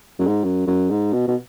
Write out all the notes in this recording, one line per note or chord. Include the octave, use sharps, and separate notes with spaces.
F#2
G#2
F#2
F#2
G#2
B2
B2